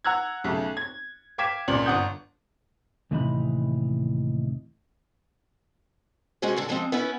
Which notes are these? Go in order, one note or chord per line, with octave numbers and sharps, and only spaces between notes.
F#5 A#5 E6 F#6 G#6
B1 C#3 A3
G#6
F5 G5 D6 G#6 B6 E7
C#2 A#2 D5 F#7
G1 D4 F#5 D#6 G6
D#2 A2 C3 E3 D#4 B5
C3 G#3 C#4 F#4 G#4 C5
G2 D3 G#3
F3 G3 G#3 C4 D#4
B3 C#4 E4 B4